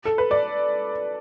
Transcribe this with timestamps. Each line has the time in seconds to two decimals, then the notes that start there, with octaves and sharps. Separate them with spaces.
0.05 A4
0.18 B4
0.31 D5